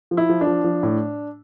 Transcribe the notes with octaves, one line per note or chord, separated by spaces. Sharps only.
F3
E4
F3
D4
F3
F3
A2